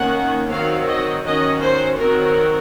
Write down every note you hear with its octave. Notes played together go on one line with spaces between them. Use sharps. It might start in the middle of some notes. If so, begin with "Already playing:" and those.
Already playing: D#3 A#3 C#4 F#5
D#3 F#3 C4 F5
D#5
D#3 F#3 C#4 D#5
C5
D#3 F#3 C4 A#4